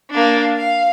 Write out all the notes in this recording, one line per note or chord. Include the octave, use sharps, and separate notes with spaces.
A#3 D4
F5